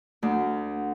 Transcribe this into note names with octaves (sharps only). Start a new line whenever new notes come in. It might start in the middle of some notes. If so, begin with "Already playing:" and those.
D2